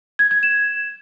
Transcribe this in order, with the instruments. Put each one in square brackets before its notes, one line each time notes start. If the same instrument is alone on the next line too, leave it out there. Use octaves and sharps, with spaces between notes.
[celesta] G#6
G#6
E7